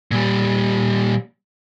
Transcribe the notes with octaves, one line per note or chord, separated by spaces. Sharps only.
A#2 G3